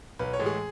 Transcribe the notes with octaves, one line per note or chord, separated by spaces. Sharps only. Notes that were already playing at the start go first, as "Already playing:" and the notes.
B1 B4
C#5
A2 E3 G#3
G#4